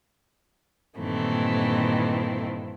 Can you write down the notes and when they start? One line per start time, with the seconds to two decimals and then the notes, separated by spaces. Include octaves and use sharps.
0.98 G2 A#2 D#3 E3 A3 C4